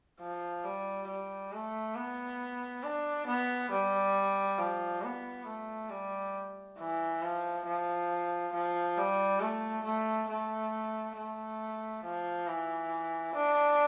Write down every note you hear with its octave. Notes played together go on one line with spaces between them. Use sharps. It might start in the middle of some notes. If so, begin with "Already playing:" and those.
F3
G3
G3
A3
B3
D4
B3
G3
F3
B3
A3
G3
E3
F3
F3
F3
G3
A3
A3
A3
A3
F3
E3
D4